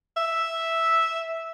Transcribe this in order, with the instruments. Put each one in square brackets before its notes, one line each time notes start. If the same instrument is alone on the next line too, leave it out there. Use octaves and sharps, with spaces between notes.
[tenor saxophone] E5